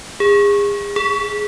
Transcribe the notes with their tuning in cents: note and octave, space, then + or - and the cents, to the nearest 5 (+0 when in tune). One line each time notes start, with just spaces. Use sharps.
G#4 -35
G#4 +5